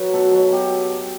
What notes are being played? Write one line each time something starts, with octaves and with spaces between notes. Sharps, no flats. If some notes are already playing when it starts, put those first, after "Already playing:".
Already playing: F#3 B4
B2 A4
F#3
B2 G4